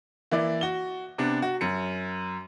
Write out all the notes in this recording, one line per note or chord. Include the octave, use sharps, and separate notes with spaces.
E3 A#3 E4 D5
F#4 G7
C3 B3 D4
F#4
F#2 C#7